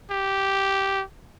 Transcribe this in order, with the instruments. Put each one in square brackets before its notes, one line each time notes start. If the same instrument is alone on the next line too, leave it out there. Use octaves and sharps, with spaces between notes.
[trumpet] G4